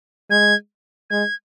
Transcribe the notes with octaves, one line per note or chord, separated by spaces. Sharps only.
G#3 G#6
G#3 G#6